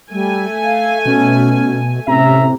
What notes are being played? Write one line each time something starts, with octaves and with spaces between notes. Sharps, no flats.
G3 A3 G#5
F5
B2 C#4
A2 C3 C#4 E5 A#5